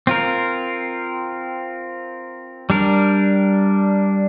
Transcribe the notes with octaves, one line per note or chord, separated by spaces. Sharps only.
C4 F4 A#4
G3 D4 A#4